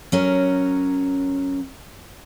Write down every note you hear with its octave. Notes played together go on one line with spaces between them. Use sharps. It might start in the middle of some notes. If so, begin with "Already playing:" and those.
F#3 C#4 A#4